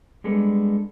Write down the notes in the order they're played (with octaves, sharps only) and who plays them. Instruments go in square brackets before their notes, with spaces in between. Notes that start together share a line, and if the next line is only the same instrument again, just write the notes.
[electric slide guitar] G3 G#3 B3 D4 A4